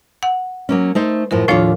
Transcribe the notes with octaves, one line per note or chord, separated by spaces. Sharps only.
F#5
F#3 A#3 C#4
A3 D#4 C5
F#2 A2 F3 A#4
D#2 A2 F3 D4 F4 C#5